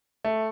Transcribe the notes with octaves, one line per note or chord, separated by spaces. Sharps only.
A3